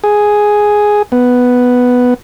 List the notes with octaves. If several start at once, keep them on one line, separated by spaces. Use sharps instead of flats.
G#4
B3